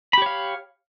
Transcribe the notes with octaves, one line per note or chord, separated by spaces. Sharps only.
G4 C#5 F5 B5